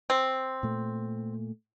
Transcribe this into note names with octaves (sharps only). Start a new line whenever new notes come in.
C4
A#2 A3